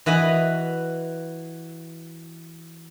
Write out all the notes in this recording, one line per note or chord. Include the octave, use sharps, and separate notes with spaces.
E3 F#4 B4 D#5